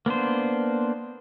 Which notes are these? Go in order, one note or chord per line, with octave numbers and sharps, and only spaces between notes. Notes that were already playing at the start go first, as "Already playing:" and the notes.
A#3 B3 D4 C5